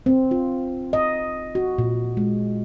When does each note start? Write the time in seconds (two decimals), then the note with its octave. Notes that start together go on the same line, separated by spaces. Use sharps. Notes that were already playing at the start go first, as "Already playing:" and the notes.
0.06 C4
0.31 F4
0.93 D#5
1.55 F#4
1.78 A#2
2.17 G#3